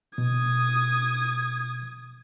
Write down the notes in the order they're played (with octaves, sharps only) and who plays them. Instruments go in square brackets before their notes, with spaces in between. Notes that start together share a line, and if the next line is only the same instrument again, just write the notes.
[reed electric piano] B2 [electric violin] D#6 G#6